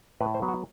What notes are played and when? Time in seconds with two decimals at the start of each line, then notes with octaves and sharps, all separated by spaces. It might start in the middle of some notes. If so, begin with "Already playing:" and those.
0.20 A2 B4
0.34 C5
0.42 F#3 B3
0.48 F#4